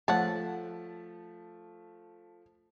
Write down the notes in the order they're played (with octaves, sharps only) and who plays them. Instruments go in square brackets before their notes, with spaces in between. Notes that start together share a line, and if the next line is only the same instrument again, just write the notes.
[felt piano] F3 A3 [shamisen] C5 C#5 F#5 [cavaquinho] A5